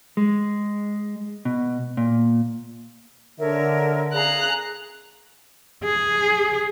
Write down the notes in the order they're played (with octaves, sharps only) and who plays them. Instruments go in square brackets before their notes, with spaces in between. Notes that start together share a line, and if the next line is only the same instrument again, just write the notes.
[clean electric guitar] G#3
B2
A#2
[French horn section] D3 [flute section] A#4 C#5 E5
[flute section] G#4 F5 [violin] A#5 F#6
[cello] G#4